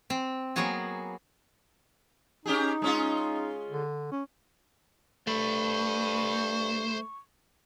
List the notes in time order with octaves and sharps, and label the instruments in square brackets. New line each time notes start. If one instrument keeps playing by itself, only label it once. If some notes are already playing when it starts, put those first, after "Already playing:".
[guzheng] C4
F#3 A#3 B3 F#4 G#4
[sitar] C#4 G4 G#4 [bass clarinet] D#4
[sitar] G#3 C#4 F4
[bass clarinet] D3
C#4
[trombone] G2 [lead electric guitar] A3 [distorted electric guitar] C5 B5 [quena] C#6